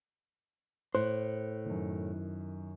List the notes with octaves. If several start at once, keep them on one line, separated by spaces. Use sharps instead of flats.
A2 C5 F#6
F#2 D#3